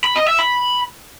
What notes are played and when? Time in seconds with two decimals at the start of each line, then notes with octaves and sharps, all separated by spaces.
0.04 B5
0.16 D#5
0.27 E5
0.39 B5